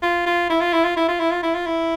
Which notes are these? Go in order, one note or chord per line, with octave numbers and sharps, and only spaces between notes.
F4
F4
E4
F4
E4
F4
E4
F4
E4
F4
E4
F4
E4